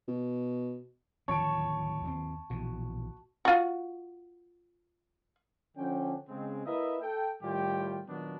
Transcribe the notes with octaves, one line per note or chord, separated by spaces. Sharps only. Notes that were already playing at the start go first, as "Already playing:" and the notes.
B2
D1 D#2 F3 C#5 A5 C#6 D7
D#2 B3 C4
A#1 B2 E3 F#4
F4 F#4
D3 F3 C#4 D4 G5
C#3 G#3 C4
A#3 E4 B4 D#5 E5
A4 G5
A2 D#3 G3 F4 G4 G5
A#2 D#3 F#3 B3 D4 F#4